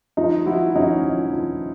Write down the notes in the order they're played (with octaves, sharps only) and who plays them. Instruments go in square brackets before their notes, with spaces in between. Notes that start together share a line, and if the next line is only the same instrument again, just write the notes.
[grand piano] F3 D#4 F4
F3 E4 F#4
F3 C#4 D#4
F3
F3